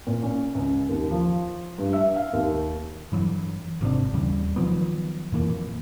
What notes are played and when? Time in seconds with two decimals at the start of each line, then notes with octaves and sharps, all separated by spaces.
0.07 A#2
0.23 C#4
0.55 C#2
0.89 D#2
1.11 F3
1.78 G2
1.93 E5
2.16 F5
2.33 D#2
3.12 G2 E3 F#3
3.81 G#1 C3 D#3 D4
4.13 D#2 C#3 E3 G3
4.56 D#3 F3 F#3 B3
5.32 F2 A#2 E3 A#3